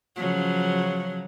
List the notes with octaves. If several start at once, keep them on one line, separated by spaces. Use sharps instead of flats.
C#3 F3 F#3